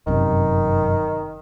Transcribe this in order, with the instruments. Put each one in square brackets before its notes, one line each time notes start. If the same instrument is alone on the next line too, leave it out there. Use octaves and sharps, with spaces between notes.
[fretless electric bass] G1 F#2 C3 [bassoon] D#3